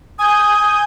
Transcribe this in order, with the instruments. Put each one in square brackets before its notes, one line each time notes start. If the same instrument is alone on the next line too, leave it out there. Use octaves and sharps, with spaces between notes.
[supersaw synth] G#5 G6 [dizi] D#6